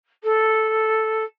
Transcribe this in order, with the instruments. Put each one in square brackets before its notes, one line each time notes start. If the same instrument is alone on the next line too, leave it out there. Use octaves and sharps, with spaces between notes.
[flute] A4